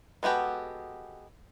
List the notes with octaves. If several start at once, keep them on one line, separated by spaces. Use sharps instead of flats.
G#3 B3 F#4 G4 A4